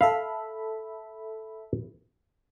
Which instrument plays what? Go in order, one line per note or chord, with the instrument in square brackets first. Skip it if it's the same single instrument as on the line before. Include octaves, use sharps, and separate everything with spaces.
[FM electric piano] A4 E5 B5 [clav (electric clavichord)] F5